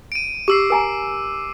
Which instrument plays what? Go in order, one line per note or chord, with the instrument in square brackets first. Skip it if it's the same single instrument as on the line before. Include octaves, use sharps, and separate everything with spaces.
[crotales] D7 D#7
[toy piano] G4 [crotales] D6 E6 C7
[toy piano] A#4 G#5 A#5